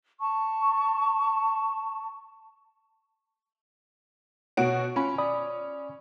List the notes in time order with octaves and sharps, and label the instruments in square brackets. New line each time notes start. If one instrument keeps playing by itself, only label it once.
[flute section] A5 C#6
[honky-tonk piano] B2 F#4 D7 [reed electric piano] C#5
[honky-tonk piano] C#4 [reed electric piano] F4 B5
[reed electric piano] D5 B5 D#6